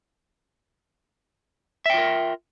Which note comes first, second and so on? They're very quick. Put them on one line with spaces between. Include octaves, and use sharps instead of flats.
E5 G5 F4 A#4